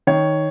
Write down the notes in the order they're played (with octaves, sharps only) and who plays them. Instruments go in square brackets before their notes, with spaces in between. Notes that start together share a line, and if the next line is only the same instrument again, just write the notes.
[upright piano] D#3 C#5